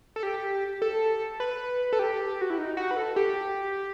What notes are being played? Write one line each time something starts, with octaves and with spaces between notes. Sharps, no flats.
A4
G4
A4
B4
A4
G4
F#4
E4
D#4
F#4
B4
A4
G4